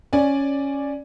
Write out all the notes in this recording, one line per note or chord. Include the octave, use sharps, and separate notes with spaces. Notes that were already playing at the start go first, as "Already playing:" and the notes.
C#4 D5 G#5